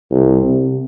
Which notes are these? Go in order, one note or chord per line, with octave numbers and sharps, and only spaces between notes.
C2
C3